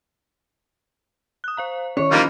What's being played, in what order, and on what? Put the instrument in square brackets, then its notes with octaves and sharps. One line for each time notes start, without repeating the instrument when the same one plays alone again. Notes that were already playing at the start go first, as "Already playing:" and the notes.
[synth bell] D#6 F#6
C5 F5 A#5
[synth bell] D#3 C#4 [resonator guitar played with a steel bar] C#5
[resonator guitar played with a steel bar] E3 F3 D#4 [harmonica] G3 A#3 F4